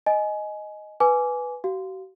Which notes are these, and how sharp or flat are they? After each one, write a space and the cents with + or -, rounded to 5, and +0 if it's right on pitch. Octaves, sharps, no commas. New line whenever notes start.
D#5 +0 G#5 +20
B4 +0 G#5 +10 D6 -15
F#4 +45 F5 +0